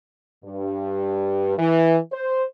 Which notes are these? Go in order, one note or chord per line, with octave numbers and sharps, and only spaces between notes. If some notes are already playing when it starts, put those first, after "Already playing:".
G2
E3
C5